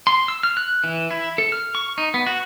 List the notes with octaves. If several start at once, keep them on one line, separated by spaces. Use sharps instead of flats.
C6
E6
F6
F#6
E3
E4
A4
F6
C#6
D#4
B3
F#4